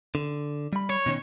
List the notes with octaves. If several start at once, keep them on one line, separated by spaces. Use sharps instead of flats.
D3
G3 B5
C#5
B2 D#3 C#4